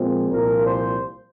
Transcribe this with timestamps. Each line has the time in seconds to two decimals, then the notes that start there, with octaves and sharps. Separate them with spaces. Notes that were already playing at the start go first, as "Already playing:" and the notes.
Already playing: A#2 F3 G#3 C4
0.31 C2 A#2 F3 A#4
0.65 C5